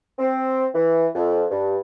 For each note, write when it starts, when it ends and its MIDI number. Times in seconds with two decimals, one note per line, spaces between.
0.19 0.66 60
0.74 1.08 52
1.15 1.44 41
1.50 1.77 43